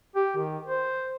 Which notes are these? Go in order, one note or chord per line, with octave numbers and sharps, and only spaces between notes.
G4
D#3
C5